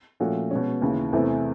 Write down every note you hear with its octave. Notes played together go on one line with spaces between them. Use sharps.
A#2 F3 A3 C#4 F#4
B2 G#3 C#4
D#2 C#3 E3
E2 C3 E3 A3